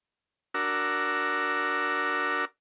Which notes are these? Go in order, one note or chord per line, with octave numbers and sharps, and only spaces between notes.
D4 F#4 A#4 E6